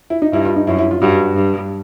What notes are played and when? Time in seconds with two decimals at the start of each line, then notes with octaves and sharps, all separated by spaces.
0.10 E4
0.22 D#4
0.33 G2 E4
0.45 F4
0.56 D#4
0.67 F#2 E4
0.78 E4
0.91 F4
1.02 G2 F#4
1.36 G2